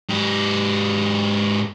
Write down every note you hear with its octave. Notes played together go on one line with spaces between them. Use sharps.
G#2 G4